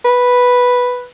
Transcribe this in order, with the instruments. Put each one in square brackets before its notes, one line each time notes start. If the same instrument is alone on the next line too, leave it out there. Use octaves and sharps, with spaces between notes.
[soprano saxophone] B4